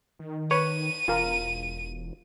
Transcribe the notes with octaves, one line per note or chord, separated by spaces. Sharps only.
D#3
B4 C#5 D#7
E1 F4 A#4